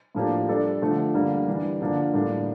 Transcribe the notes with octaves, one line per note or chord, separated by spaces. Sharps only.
A2 F3 A#3 D4 G4
G3 D4 A4 D5
D3 F3 A3 D4
G2 D3 G3 A#3
E3 G3 D4
G2 D3 F3 A#3 D4
A2 G3 A#3 D4